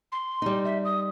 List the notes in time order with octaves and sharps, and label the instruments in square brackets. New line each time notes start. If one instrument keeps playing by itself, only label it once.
[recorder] C6
[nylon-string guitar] G3 D#4
[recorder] E5
D#6